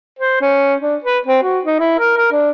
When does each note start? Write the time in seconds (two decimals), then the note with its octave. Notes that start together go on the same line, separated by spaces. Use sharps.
0.19 C5
0.41 C#4
0.82 D4
1.04 B4
1.27 C4
1.43 F#4
1.65 D#4
1.79 E4
1.99 A#4
2.17 A#4
2.32 D4